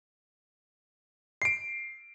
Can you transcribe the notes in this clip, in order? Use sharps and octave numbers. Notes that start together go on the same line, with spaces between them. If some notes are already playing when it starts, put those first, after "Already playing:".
C7 D7